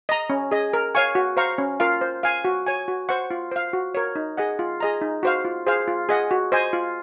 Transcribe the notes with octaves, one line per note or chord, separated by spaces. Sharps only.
D#5 A#5
C#4
G#4 D#5
A#4
C#5 F5 G#5 C#6
F#4
C5 F5 A#5 C#6
C#4
F4 A#4 F5
C5
F5 G#5
F#4
C#5 G#5
F#4
C5 F#5 C#6
F4
C5 F5
F#4
A#4 C#5
D#4
G#4 D#5 F#5
F4
G#4 D#5 A#5
D#4
F#4 C5 F5
F4
G#4 C5 F5
F4
G#4 D#5 F#5
F#4
C5 D#5 G#5
F4